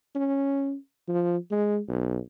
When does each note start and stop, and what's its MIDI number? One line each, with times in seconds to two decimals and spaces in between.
0.15 0.75 61
1.08 1.37 53
1.51 1.80 56
1.88 2.18 35